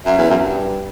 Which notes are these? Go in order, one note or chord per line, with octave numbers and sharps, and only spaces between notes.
F#2 E5
E2
F#2
G2